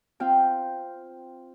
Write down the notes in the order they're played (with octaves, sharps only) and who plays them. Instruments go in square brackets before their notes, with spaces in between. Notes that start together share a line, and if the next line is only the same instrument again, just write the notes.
[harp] C4 F4 G5